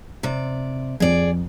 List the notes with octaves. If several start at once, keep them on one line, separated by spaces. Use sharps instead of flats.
C3 D5
F2 G#4 D5